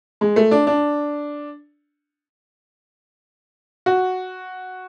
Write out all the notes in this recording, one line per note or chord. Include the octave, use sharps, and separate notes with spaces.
G#3
A3
D4
D4
F#4